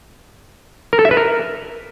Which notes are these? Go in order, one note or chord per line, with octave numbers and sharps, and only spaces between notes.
A#4
A4
E5
B4
A#4